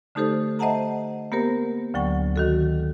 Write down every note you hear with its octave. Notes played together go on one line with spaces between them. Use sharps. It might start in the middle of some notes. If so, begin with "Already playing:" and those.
D3 A3 D#4 G4 A4 C5
C5 D#5 E5 F#5 A5 A#5
A#3 B3 G4 A#4 C5
D2 D3 F#3 G5 C#6
D#3 F#4 A4